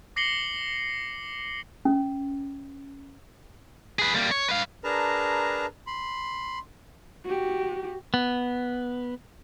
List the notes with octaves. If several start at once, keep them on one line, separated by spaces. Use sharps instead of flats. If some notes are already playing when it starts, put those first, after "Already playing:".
D6 A#6 C7 C#7 F#7 G7
C#4
G#4 B4
G3 A#3
C#5
B4 F5
D4 G#4 A#4 B4 A5 A#5
B5 C6
F#4 G4
B3